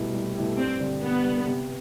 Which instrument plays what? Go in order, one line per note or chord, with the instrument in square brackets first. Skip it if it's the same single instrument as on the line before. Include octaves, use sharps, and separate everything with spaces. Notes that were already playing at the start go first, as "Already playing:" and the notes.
Already playing: [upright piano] C2 B2 A3 E4 G4
C2
B2 A3 E4 G4
[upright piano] G2 [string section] C4
[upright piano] D3 G3
[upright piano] G2 [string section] B3
[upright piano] D3 G3
C3